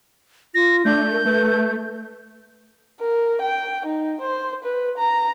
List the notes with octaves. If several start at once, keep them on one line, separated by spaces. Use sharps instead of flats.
F4 A#6
A3 D4 G6
A#4
A3 B4
A#4
G5
D#4
C5
B4
A#5